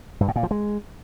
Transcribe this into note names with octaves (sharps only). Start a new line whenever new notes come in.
G2
A2
A#2
F3
G#3